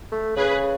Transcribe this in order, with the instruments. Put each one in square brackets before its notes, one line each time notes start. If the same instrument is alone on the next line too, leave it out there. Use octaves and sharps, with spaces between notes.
[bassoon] A3
[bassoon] C#3 [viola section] G#4 B4